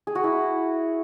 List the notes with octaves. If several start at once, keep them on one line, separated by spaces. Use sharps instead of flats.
G#4
F#4
E4